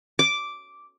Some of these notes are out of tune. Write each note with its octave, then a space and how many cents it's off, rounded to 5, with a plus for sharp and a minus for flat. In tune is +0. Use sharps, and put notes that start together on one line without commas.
D6 -5